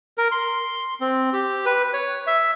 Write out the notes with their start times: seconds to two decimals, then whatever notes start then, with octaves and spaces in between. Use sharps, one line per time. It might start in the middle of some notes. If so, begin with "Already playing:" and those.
0.18 A#4
0.32 C6
1.01 C4
1.33 G4
1.66 B4
1.93 C#5
2.27 E5